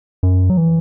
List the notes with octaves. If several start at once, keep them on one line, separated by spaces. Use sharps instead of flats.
F#2
F#3
E3